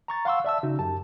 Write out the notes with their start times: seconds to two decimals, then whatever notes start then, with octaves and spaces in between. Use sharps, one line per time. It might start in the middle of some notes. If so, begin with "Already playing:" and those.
0.08 A#5 C#6 A6
0.25 F5 F#5 C6 C#6 E6
0.44 D5 E5 A5 E6
0.63 C#3 D#4 F#4
0.79 F#2 G4 A5